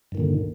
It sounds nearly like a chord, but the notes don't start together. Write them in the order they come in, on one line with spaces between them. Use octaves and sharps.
G2 D#3 A#2 D3